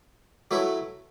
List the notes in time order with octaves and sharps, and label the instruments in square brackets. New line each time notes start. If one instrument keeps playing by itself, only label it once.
[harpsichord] F#3 A3 E4 B4